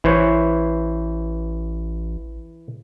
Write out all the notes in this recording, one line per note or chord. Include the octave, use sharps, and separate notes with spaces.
A1 E3 C5 C#5